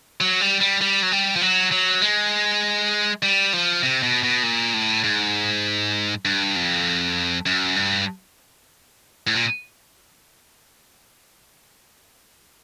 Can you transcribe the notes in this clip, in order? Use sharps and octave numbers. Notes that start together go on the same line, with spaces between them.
F#3
G3
G3
G3
F#3
G3
F3
F#3
F#3
G#3
G3
F3
C3
B2
B2
A#2
A2
G#2
G2
F2
F#2
G2
A2
A#2